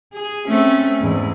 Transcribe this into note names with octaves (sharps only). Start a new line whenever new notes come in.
G#4
A3 C4 C#4
E2 G#2